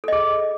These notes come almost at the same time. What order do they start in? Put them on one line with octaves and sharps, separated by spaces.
A4 D#5 G#4